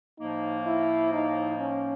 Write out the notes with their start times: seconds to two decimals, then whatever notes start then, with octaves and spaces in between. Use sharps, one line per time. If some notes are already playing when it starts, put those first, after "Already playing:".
0.19 A2 F3 A#3 D#4
0.66 E4
1.13 D#4
1.59 C#4